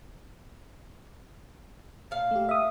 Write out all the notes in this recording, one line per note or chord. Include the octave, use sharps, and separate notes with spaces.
A#2 F5
A3 G4
E5 D#6